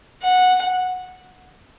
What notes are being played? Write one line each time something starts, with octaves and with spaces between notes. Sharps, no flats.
F#5